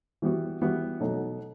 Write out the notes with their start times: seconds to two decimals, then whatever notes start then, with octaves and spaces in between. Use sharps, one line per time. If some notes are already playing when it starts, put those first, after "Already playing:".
0.22 E3 G3 B3 F#4
0.61 E3 G3 B3 F#4
1.00 B2 F#3 A3 D#4